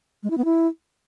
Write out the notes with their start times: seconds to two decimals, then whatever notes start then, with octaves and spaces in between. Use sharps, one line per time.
0.23 G#3
0.30 E4
0.38 B3
0.45 E4